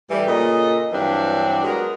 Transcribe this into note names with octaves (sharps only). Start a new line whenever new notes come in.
A2 E3 G3
A#2 C#3 A4 D#5
G2 E3 F#3 C4 D4
F#3 G#3 B3 A#4